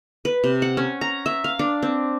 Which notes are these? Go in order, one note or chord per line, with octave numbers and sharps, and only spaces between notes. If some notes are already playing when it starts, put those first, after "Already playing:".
B4
C3
F#5
C#4
A#5
E5
F5
D4
C4